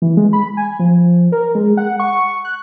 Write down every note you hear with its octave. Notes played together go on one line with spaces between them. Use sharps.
E3
G#3
B5
G#5
F3
A#4
G#3
F#5
C#6
F#6